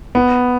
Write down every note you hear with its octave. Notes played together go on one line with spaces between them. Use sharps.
B3